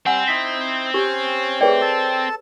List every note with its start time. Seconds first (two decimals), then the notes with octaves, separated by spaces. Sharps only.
0.06 G3 C4 F#5 G#5 E6
0.28 D#4 E4 B6
0.94 C#4 G4 C#5
1.61 A3 G4 G#4 B4 C#5 D5 G5
1.81 A4 A5